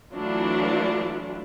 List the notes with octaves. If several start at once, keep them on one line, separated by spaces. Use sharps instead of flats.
E3 F#3 A3 D4 E4 F4